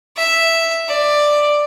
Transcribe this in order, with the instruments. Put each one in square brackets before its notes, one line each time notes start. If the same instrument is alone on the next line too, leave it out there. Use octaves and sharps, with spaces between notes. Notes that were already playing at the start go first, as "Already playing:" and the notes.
[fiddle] E5
D5